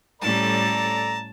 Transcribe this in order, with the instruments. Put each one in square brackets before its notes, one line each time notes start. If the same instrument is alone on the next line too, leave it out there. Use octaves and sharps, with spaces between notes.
[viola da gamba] A2 G3 C#4 [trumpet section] A4 D5 A#5 [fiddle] A5